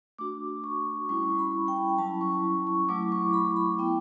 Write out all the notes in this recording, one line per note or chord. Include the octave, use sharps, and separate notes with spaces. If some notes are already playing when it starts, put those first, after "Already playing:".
A3 D4 F#4 D6
C#6
G3 C#4 E4 C#6
B5
G5
F#3 C#4 E4 A5
C#6
C#6
F#3 A3 E4 D6
C#6
B5
B5
B3 E4 G5